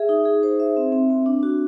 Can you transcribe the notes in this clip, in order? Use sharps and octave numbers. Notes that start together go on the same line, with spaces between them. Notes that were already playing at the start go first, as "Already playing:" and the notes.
Already playing: G#4 E5
D#4
G#4
C5
E5
C4
C4
C4
D4
F#4